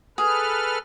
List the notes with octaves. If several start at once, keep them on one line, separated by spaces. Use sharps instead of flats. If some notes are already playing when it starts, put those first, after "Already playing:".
G#4 A4 B4 F6